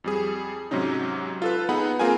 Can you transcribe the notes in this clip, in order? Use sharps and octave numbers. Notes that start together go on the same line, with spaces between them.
F2 G3 G#4
G#2 C3 F#3 C#4 D#4
F4 A4 B4
B3 D#4 G#4 F#5 B5
A#3 C4 F4 G#4 A#4 G#5